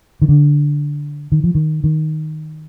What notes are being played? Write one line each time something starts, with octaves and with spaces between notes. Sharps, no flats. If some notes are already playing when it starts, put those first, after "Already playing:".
D#3
D3
D#3
F3
D#3
D#3